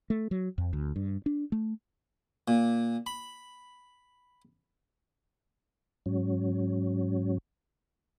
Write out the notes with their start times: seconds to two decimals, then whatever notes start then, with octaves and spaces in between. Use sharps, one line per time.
0.10 A3
0.31 F#3
0.58 F2
0.73 D2
0.96 G2
1.26 D4
1.52 A3
2.48 A#2
3.06 B5
6.06 G#2 F#3 C#4